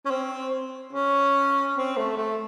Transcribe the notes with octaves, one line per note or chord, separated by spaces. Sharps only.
C#4
C4
C#4
C4
A3
A3